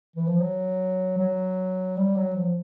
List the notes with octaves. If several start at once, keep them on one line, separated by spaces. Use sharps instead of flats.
E3
F3
F#3
F#3
G3
F#3
F3